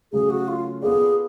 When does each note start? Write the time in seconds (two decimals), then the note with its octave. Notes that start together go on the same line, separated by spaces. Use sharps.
0.12 C#3 F#3 A3 G#4
0.30 F#4
0.48 F4
0.82 B3 F4 G#4 A4 D5